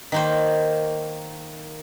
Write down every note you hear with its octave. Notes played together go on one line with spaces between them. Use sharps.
D#3 A#3 C5